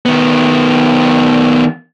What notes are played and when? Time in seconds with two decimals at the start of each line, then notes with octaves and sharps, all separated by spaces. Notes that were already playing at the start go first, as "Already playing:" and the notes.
0.06 D#3 B3